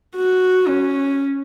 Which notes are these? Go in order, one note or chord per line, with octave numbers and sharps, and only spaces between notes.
F#4
C#4